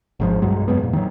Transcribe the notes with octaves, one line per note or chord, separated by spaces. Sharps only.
G#1 G#2 F3
B1 G2 F#3 G#3
F#2 G#3 B3
F2 A#2
D#3 F#3